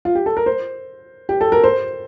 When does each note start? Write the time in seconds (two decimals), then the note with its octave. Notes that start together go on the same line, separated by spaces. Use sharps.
0.05 F4
0.15 G4
0.26 A4
0.37 A#4
0.46 C5
1.29 G4
1.41 A4
1.52 A#4
1.64 C5